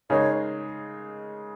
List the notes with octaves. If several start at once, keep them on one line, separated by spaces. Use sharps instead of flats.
C#3 G#3 D#4 A#4 C#5 D#5